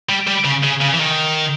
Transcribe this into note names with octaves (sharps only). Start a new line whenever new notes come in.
G3
G3
C#3
C#3
C#3
E3
D#3